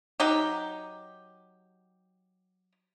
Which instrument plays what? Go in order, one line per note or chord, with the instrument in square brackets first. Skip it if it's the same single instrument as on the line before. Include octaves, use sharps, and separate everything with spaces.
[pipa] F#3 D#4 G4